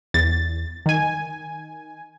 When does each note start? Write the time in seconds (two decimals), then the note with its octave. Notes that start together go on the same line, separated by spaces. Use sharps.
0.14 E2 A6
0.86 D#3 G#5